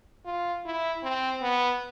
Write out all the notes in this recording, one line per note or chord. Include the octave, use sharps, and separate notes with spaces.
F4
E4
C4
B3